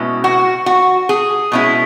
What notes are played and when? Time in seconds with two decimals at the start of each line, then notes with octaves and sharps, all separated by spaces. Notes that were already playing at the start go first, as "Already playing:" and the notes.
Already playing: B2 G#3 C#4 E4
0.24 F#4
0.66 F#4
1.09 G#4
1.52 B2 G#3 C#4 E4